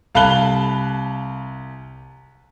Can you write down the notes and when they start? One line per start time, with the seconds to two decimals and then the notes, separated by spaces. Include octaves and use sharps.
0.15 C2 F5 A5 B5 F#6 G7